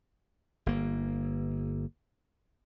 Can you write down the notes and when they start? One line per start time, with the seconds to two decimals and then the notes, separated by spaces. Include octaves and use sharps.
0.66 G1 A#3